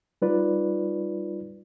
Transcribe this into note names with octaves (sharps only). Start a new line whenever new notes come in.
G3 D#4 F4 B4 D5